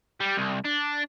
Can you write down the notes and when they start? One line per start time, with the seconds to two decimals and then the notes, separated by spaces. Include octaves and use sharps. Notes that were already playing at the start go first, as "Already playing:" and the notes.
0.20 G3
0.38 C2
0.65 D4